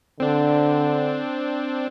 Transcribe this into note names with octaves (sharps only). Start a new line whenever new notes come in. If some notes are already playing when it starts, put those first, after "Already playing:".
D3 C4 D4